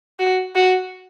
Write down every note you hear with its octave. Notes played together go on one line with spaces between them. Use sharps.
F#4
F#4